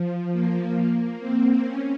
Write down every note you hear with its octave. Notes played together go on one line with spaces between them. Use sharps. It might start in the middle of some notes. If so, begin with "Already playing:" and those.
Already playing: F3
A#3
C4
C#4